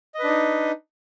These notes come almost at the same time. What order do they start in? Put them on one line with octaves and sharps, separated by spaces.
D#5 B4 D4 D#4